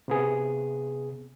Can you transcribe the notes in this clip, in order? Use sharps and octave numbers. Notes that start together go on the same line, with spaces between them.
C3 B3 G#4